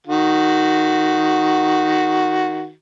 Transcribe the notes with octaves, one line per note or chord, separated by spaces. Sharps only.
D#3 F#4